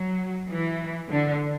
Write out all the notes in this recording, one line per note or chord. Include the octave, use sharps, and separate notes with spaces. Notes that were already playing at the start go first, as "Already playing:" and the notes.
Already playing: F#3
E3
D3